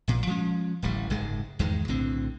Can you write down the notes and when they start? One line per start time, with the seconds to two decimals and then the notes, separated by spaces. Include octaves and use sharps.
0.08 A#1 A#2
0.27 F3 G#3 C#4
0.82 D1 A1 G3
1.10 F#1 G#2 G#3
1.59 E2 G#2 D#3 G#3
1.88 B1 A2 D3 C4